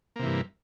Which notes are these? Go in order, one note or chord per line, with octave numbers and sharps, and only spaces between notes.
G2 C3 E3 A#3